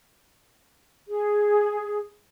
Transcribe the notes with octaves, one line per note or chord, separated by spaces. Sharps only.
G#4